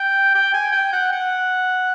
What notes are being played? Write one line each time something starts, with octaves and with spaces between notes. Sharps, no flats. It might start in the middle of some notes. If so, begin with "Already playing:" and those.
Already playing: G5
G5
G#5
G5
F#5
F#5